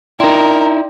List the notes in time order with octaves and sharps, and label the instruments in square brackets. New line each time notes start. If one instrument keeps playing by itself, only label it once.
[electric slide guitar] D#4 E4 [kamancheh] A#4 [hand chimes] D5 G5 C6